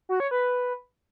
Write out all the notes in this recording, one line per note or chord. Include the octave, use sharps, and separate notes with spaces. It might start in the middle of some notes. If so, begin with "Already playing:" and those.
F#4
C#5
B4